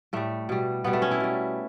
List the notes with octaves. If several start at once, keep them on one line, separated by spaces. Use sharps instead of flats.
A2 G3 A3
B2 G3
B2 G3 B3
A3
C#4
E4
B2 G3